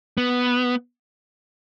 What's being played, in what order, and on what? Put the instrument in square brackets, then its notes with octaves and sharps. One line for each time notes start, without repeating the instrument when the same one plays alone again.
[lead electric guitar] B3